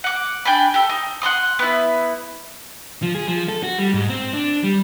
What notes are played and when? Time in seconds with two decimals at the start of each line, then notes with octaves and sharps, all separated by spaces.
0.04 F#5 D6
0.45 D4 G5 G#5 B5
0.74 G4 A4
0.89 D#4
1.22 F#5 A#5 C6 D#6
1.59 B3 E4
3.02 F3
3.15 G#4
3.27 F3
3.49 A4
3.63 F#4
3.79 G3
3.94 G#2
4.10 C4
4.33 D4
4.64 G3